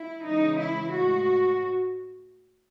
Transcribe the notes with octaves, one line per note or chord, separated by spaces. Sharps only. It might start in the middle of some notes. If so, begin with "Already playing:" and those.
Already playing: E4
C#3 E3 G#3 D#4
E4
A2 G#3 F#4